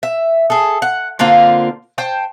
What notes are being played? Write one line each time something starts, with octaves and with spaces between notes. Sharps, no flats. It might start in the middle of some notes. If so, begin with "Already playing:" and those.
E5
G#4 A4
F#5
D3 A#3 C4 F4
C5 G5 A5